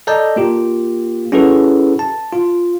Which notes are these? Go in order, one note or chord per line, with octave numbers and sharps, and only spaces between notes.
A4 D5 D#5 A5 A#5 G6
A#3 F4 G4
C#4 E4 F#4 G#4 A4 B4
A5
F4